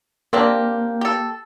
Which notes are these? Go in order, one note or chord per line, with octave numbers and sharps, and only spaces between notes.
A#3 C4 D4 G4
G4 A4